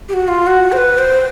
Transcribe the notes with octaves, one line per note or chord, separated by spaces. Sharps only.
G4
F#4
F4
F#4
C5
B4
C5